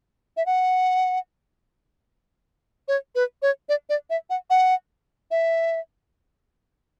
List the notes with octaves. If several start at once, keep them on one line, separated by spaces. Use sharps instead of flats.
E5
F#5
C#5
B4
C#5
D5
D5
E5
F#5
F#5
E5